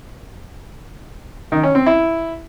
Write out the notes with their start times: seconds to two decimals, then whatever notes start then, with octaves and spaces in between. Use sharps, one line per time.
1.52 D#3
1.63 C#4
1.75 C4
1.86 E4